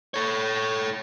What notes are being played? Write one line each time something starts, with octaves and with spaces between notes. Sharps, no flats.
A4 C#5